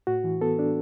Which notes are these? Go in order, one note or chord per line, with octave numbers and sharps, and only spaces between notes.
A2 F#4
E3
B3 A4
D4